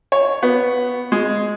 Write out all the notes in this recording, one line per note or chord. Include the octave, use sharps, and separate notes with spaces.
C#5
B3
G#3